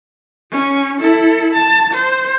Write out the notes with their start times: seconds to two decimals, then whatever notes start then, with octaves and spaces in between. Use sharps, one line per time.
0.51 C#4
0.99 E4 A4
1.53 A5
1.93 C5